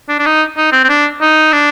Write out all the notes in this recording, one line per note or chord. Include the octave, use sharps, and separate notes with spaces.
D4
D4
D#4
D#4
C4
C4
D4
D#4
D4